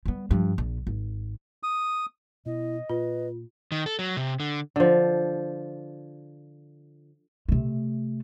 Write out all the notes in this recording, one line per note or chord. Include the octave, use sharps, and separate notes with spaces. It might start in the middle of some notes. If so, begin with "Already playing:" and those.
G3 B3
G2 F3
A#1
G#1
D#6
B2 E4 D#5
A#2 F4 B4
D#3
A4
F#3
C3
D3
D3 F3
C3 A3